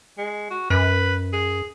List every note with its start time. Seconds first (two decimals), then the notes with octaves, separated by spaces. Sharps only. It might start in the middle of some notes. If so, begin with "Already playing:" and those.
0.18 G#3
0.50 F#4
0.70 F#2 B4
1.33 G#4